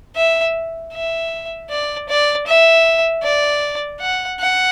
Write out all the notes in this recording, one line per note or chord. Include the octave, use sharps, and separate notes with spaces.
E5
E5
D5
D5
E5
D5
F#5
F#5